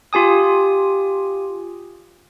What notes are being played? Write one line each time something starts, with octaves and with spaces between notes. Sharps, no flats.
F4 G4 G#5 D#6